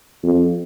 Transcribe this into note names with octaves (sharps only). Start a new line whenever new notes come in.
F2